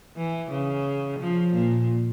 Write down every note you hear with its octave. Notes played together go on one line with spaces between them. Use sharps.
E3
C#3
F3
A#2